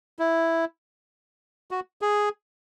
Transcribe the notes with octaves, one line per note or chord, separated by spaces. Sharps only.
E4
F#4
G#4